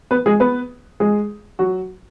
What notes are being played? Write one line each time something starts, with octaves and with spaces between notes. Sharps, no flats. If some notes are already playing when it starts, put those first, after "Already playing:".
B3 B4
G#3 G#4
B3 B4
G#3 G#4
F#3 F#4